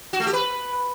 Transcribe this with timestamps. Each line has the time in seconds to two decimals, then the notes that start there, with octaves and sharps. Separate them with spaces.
0.13 F#4
0.20 A3
0.27 G4
0.33 B4